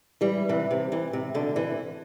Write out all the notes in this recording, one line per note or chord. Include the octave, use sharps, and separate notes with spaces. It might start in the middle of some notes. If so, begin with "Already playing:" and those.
E3 G3
C3 E3
C3
C3 E3
C3
B2 D3
C3 E3